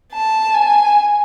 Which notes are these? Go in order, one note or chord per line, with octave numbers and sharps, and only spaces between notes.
A5
G#5